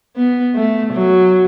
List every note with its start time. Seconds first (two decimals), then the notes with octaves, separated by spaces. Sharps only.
0.16 B3
0.55 A3
0.93 F#3